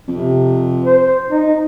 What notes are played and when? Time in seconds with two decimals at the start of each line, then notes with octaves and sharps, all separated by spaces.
0.08 F2 C3
0.85 C5
1.30 D#4